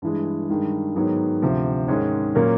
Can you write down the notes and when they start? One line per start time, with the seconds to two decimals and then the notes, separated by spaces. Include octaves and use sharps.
0.02 G2 E3 G#3
0.49 G2 D#3 G#3
0.96 G#2 D#3 F#3 B3
1.42 D2 C3 F3
1.88 G#2 D#3 G#3 C#4
2.35 A#2 F#3 A#3 C#4